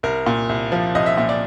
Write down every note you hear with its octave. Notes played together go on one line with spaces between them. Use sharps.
C2 A#4
A#2
C2
F3
C2 D#5
E5
A#2 E5
D5